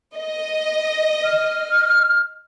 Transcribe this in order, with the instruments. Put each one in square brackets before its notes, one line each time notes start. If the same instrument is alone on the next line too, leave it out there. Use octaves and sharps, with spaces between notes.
[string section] D#5
[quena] F6